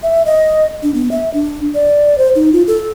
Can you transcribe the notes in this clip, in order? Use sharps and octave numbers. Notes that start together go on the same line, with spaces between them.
E5
D#5
D4
B3
E5
D4
D5
C5
D#4
F4
A4